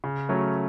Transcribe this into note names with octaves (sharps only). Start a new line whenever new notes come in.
C#3
F#3 A3 C#4